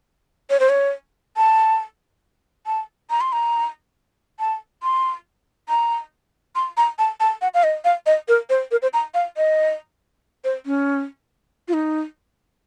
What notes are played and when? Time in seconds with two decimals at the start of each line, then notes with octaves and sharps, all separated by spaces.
0.50 C#5
0.60 C5
0.69 C#5
1.37 A5
2.66 A5
3.10 A#5
3.21 C6
3.32 A#5
4.39 A5
4.83 C6
5.69 A#5
6.55 C6
6.77 A#5
6.99 A5
7.20 A5
7.42 F#5
7.54 F5
7.64 D#5
7.85 F5
8.06 D#5
8.28 A#4
8.50 C5
8.71 A#4
8.82 C5
8.93 A#5
9.14 F5
9.37 D#5
10.44 C5
10.66 C#4
11.68 F4
11.73 D#4